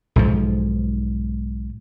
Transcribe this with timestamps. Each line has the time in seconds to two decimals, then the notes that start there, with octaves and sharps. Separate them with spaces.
0.16 B1 G#2 F3